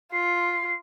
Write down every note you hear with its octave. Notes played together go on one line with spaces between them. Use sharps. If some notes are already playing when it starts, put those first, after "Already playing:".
F4 C7